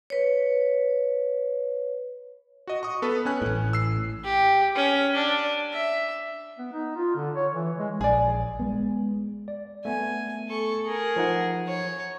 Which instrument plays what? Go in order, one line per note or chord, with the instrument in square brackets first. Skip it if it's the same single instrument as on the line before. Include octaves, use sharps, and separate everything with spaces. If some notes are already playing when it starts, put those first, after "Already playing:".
[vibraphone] B4 C#5
[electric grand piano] F#4 D#5
C#6 D#6
B3 A4 B4
C#4 G#5 F#6
[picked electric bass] A1 A2
[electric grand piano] E6 C7
[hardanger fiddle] G4
C#4
D4
E5
[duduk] B3
D#4
F4
D3
C#5
E3
G#3
[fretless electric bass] A#1 [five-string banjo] G#4 D5
[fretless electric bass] G#3 B3
[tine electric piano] D5
[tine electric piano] A3 B3 [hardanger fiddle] G#5
[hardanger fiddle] A4 C#6
G#4 A#4
[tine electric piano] F3 D#4 F#5
[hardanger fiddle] C#5